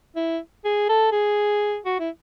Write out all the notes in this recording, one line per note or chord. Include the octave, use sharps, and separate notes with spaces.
E4
G#4
A4
G#4
F#4
E4